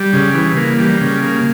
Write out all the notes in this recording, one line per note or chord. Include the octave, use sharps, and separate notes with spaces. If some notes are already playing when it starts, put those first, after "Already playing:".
Already playing: G3
C#3
E3
A#3
G3
C#3
A#3